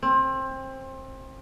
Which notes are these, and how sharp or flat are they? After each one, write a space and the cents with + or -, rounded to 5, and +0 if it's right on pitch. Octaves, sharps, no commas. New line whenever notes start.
C4 +25